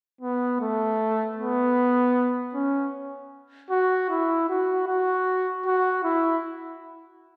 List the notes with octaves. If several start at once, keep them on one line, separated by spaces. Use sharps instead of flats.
B3
A3
B3
C#4
F#4
E4
F#4
F#4
F#4
E4